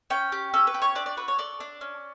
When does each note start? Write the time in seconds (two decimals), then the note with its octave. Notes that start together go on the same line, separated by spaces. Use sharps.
0.10 C#4 G5
0.32 G4
0.53 C#4 A4
0.67 B4
0.74 G4
0.82 C#5
0.95 D4 D5
1.06 D5
1.17 F#4 B4
1.28 C#5
1.38 A4 D5
1.60 D4
1.81 C#4